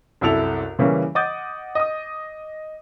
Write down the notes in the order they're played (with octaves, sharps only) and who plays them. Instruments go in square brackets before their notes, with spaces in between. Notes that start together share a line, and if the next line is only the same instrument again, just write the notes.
[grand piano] C2 F#2 E4 A4 F7
C#3 E3 G3 A#3 C#4
D#5 F#5 D6 D#6 G6 A6
D#5 D#6